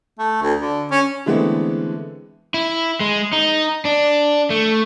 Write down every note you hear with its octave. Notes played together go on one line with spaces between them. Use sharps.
A3
D2
D3
C#4
D3 E3 G#3 A3 B3 C4
E4
G#3
D#4
D4
A3